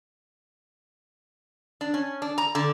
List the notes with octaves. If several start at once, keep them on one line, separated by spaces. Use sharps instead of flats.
D4
C#4
D4
A#5
D3